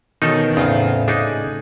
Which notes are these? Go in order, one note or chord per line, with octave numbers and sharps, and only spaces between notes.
B2 D#3 E3 C#4 D#4 A4
E2 A2 C#3 C4 F4 A4
C#3 A3 D4 D#4 G#4